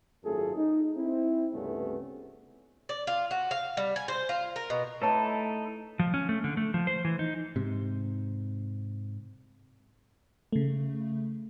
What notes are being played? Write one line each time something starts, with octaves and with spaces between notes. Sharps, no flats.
G#1 F#2 A3 F4 G#4 A4
D#4
C4 E4
C#2 G2 C3 A3 B3 C#4
D5
F4
F#4
F5
G3
G#5
C5
F4
A#4
B2
A3 D#4 E4 A4 B4 C#5 A5
F3
C#4
A3
D3
A3
F3
C5
E3
D#4
G#2 C3
C#3 A3